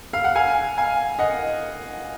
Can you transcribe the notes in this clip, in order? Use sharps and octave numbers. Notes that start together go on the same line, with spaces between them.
F5
F#5
F5 G#5
F5 G#5
D#5 F#5